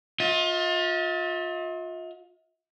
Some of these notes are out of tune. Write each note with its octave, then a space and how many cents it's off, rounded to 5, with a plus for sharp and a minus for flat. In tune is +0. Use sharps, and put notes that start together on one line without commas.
F4 +30 E5 -45